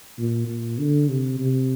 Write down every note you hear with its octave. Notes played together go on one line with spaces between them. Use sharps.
A#2
A#2
D3
C3
C3